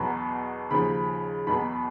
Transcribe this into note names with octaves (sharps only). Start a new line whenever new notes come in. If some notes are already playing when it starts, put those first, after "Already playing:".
Already playing: E2 B2 F#3 B5
D#2 C#3 F3 B5
E2 B2 F#3 B5